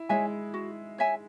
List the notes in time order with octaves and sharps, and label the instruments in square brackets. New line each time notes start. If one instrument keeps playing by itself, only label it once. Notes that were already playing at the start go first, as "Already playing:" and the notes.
Already playing: [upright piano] E4
[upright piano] G#3 [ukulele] C#5 E5 G#5
[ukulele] F#4
C#5 E5 G#5